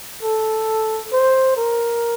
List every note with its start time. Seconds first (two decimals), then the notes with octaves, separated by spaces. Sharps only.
0.23 A4
1.13 C5
1.57 A#4